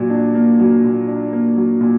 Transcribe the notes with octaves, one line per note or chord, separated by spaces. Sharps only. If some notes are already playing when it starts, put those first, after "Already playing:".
Already playing: A#2 F#3
D4
A#3
F#3
A#2
D4
A#3
F#3
A#2